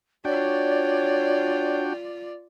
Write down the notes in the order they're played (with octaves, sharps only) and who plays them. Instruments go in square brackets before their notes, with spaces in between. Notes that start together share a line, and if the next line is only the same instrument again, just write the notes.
[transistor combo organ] D4 F#4 G5 [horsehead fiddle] F4 D5 [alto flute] C#5